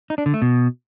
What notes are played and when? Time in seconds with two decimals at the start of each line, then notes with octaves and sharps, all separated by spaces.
0.10 D#4
0.18 D4
0.26 D3
0.34 A3
0.42 B2